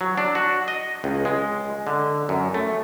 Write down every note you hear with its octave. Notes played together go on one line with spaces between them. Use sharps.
F#3
D4
F#4
D#5
C#2
G#3
D3
F#2
A3